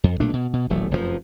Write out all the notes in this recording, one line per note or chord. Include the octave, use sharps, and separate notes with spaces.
F2
B1 A#2 A3 D4
B2
B2
D#1 A1 F#3 A3
F1 F#2 A2 F3